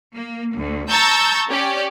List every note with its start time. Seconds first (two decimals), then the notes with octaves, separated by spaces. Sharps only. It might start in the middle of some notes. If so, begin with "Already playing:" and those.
0.15 A#3
0.56 D2
0.89 A5 A#5 C#6 E6 G6 A6
1.48 C#4 G4 D5